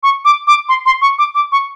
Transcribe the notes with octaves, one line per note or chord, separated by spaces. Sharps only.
C#6
D6
D6
C6
C6
C#6
D6
D6
C#6